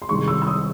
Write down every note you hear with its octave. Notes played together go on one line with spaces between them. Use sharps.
C6
C2 C3 D#3 G#3 C#6
E6
E6
D#6